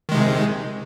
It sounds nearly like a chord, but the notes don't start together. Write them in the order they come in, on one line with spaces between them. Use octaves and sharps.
D#3 G#3 C3